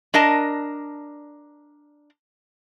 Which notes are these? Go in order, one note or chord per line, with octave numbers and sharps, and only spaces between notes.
D4 A#4 D#5 A5